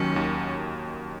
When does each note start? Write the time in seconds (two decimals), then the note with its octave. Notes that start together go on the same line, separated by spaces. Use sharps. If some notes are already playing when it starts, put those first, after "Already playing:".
Already playing: D#2 D#3 F#3 C#4
0.16 D#2